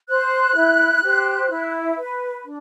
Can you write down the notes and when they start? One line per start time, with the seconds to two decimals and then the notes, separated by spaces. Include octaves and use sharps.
0.09 C5 F#6
0.56 E4
1.03 G4 C5
1.51 E4
1.97 B4
2.45 D4